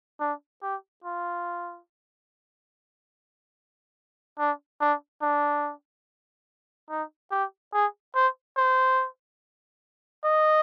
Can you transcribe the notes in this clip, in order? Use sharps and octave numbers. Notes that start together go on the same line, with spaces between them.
D4
G4
F4
D4
D4
D4
D#4
G4
G#4
C5
C5
D#5